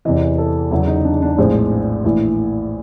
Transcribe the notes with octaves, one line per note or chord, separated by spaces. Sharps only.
E2 C3 E3 D#5
A4
E2 C#3 F#3 E4
D#4
D4
D4
A#1 A2 F3 G#3 C4
A#1 A2 E3